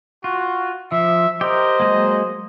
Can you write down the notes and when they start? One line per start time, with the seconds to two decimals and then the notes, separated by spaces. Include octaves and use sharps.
0.24 F4 F#4
0.92 F3 E5
1.41 G4 A#4 C5 D#5
1.80 F#3 G#3 A#3